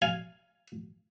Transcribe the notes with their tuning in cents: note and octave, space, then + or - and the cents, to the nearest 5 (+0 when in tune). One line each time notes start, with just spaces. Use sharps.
F5 +0 G#5 +0